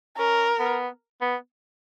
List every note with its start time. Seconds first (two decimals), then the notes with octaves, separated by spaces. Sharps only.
0.18 C#4 A#4
0.59 B3
1.21 B3